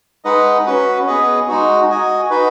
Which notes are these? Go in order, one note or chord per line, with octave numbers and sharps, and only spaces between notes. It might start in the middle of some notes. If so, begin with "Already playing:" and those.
G#3 D#4 B4 D#5 F#5
C#4 F#4 B4
B3 G#4 B4 D#5
G#3 D#4 F#4
F#4 D#5 G#5
D#4 F#4 B4